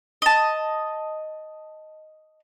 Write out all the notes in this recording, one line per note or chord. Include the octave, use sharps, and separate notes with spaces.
D#5 A5